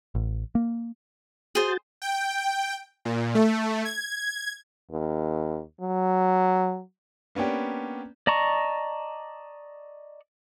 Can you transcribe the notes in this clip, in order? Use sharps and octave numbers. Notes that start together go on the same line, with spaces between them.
A1
A#3
F#4 G#4 C5 G6 A6
G5
A#2
A3
G#6
D#2
F#3
A#3 B3 C#4 D4 G4
D5 D#5 A5 A#5 C#6